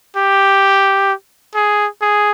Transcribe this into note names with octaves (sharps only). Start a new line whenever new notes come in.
G4
G#4
G#4